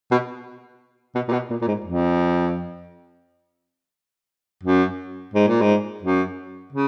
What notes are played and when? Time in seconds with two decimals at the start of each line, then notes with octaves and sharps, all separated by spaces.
0.11 B2
1.15 B2
1.28 A#2
1.32 B2
1.50 A#2
1.61 A#2
1.68 G#2
1.84 F2
4.63 F#2
5.34 G#2
5.47 A#2
5.61 G#2
6.02 F#2
6.73 C#3